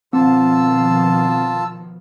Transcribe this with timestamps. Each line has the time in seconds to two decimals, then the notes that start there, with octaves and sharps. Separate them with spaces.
0.13 B2 D#3 F3 C4 F4 A5 E6